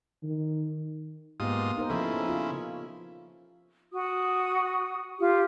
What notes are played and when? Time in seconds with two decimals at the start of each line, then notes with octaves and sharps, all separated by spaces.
0.23 D#3
1.40 G#2 A#3 B3 F4 G4 D#6
1.77 D#4 A#4 C5
1.90 C#3 F3 E4 A4
2.29 F4
3.93 F#4 D#6
5.19 F4 G4